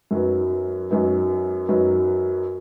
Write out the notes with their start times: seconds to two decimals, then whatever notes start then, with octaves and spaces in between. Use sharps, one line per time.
0.11 F#2 F#3 D#4 B4
0.89 F#2 F#3 D#4 B4
1.68 F#2 F#3 D#4 B4